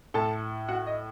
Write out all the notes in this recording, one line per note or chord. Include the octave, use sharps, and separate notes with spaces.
A2 A4 A5
F#4 F#5
D#5